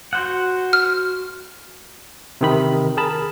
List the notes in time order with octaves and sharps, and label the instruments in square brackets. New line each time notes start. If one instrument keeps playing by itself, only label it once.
[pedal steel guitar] F#4 C5 F#5
[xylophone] F6
[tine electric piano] C3 D#3 B5
G#4 A#4 A5 B5